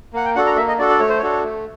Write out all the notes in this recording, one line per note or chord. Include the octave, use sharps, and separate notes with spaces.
A#3 F#5
G5
D4 F#4 A4 F#5
A#5
A#3 E5
D#5
D4 F#4 A4 D5
D5
A3 C#5
C5
D4 F#4 A4 C#5
A3